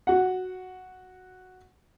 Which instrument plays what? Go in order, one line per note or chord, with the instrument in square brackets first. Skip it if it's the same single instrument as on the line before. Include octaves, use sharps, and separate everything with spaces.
[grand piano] F#4 F#5